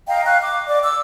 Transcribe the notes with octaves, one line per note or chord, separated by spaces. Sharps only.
D#5 F5 G5 A#5
F5 C#6 F#6
D6
D5 D#5 D6
D6 E6